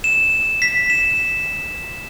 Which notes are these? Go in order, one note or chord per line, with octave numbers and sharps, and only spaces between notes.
E7
B6
E7